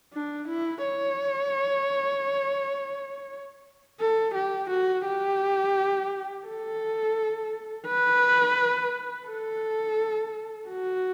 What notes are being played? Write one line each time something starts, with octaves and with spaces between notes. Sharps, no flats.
D4
E4
C#5
A4
G4
F#4
G4
A4
B4
A4
F#4